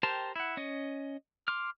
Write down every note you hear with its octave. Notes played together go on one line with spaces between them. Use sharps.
G4 A#4 C5 G5 A5
E4 F#5
C#4 D#5
C6 D6 F6